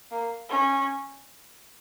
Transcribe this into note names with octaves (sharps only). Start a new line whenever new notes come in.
A#3
C#4